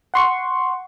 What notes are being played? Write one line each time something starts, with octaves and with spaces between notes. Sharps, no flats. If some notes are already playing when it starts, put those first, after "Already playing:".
F#5 C6 C#6